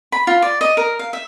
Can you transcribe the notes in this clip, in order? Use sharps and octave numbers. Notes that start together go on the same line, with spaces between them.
B5
F4
D5
D#5
A#4
F5
E5